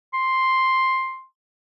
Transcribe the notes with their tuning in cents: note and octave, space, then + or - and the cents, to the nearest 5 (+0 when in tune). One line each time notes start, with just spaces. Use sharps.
C6 +5